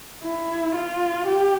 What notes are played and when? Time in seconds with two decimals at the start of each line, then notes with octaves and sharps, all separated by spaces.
0.23 E4
0.75 F4
1.27 G4